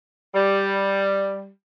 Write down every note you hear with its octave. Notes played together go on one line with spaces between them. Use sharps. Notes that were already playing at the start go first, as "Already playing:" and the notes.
G3